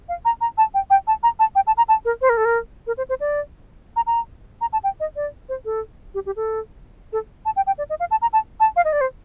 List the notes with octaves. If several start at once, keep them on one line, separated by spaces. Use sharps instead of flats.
F5
A#5
A#5
A5
G5
G5
A5
A#5
A5
G5
A5
A#5
A5
A#4
C5
A#4
A4
A#4
A#4
C5
C5
D5
A#5
A#5
A#5
A5
G5
D#5
D5
C5
A4
G4
G4
A4
A4
A5
G5
G5
D5
D#5
F5
A5
A#5
A5
A5
F5
D#5
D5
C5